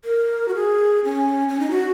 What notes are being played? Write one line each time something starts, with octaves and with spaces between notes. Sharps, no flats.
A#4
F#4
G#4
C#4
C#4
D#4
F#4